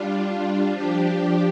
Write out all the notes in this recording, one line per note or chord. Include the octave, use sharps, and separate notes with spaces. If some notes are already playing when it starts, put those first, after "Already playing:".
Already playing: G3 D4 F4
F3 D4 G4